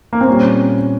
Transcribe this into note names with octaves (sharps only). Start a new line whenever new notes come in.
A#3
C4
A#2 G3 C#4